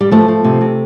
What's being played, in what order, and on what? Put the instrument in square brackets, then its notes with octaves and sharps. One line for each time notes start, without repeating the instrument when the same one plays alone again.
[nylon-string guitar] G3
F3 A3
F3
C3
C3